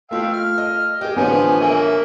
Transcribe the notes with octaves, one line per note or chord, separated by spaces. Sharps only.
A3 F4 F5 G5 E6
F6
D#5
G4 G#4 D#5
A1 D3 F3 B3 G#5
A#3 E5